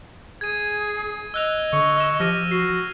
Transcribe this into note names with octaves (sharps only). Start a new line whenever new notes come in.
G#4 G#6 D#7
D#5 E6 F#6 F7
D3 C#6
E6 E7
F3 G4 F6 A#6 D#7
F#4 C7